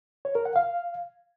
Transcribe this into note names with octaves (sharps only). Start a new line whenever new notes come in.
C#5
A#4
F#5
F5